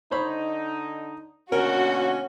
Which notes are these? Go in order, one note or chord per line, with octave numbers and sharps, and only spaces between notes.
D3 D#4 C5 C#5 B5
B2 D3 A#3 C#4 F#4 A#4